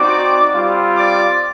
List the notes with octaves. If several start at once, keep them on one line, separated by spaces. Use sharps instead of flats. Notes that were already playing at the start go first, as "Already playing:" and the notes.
Already playing: C4 D#4 F#4 D5 D6
G3 C4 F4
D5 D6